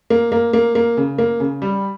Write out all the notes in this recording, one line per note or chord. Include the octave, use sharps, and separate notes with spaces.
A#3
A#3
A#3
A#3
C#3
A#3
C#3
G3